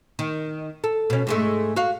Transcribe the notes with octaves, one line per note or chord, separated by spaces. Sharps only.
D#3
A4
B2 C#4
G#2 G#3 A3
F#4 F5